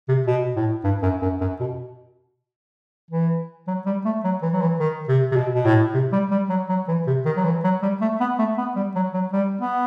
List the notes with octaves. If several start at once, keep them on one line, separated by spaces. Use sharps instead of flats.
C3
B2
A2
G2
F#2
F#2
F#2
B2
E3
F#3
G3
A3
F#3
E3
F#3
E3
D#3
C3
C3
B2
B2
A2
C3
G3
G3
F#3
F#3
E3
C3
D#3
F#3
E3
F#3
G3
A3
B3
A3
B3
G3
F#3
F#3
G3
B3